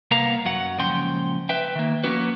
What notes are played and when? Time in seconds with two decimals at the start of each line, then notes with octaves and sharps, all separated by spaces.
0.11 C2 A#3 B3 A#4 F5 A#5
0.45 F#2 F#3 F#5
0.78 C#2 A#2 F3 C#4 G5 C6
1.49 B4 E5 G5
1.75 D#3 A#3
2.04 F3 A#3 B3 C#4 F#4 B4